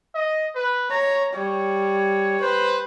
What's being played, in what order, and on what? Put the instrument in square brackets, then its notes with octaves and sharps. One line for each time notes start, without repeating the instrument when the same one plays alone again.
[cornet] D#5
B4
[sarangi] C#5 [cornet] A#5
[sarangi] G3 [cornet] C#5
[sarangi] B4 [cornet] C5